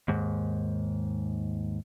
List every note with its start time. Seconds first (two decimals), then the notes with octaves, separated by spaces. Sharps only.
0.08 D#2 G#2